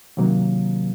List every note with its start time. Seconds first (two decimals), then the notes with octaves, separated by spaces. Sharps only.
0.17 C3 D#3 F#3 A#3